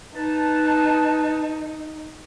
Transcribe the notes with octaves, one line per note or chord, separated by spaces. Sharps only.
D#4 B4 A5